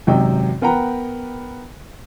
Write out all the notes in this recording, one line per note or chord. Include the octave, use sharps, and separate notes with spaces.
G#1 F#2 C3 D#5 G5
B3 A#4 B4 F#5 G5 A#5